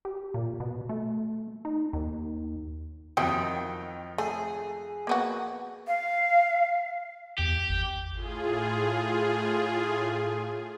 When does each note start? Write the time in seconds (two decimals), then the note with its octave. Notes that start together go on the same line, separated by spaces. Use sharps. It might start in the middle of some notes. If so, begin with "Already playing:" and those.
0.05 G4
0.34 A#2
0.60 B2
0.89 A3
1.65 D#4
1.93 D#2
3.17 F2 D#3 F#3 E4 G4 G5 D#6
4.18 A3 G#4
5.07 A#3 B3 F#4
5.87 F5
7.39 E2 G4
7.69 G#1
8.14 A2 F4 G#4